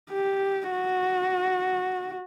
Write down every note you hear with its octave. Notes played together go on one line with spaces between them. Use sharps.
G4
F#4